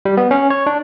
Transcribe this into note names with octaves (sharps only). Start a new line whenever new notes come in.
G3
B3
C#4
C#5
D4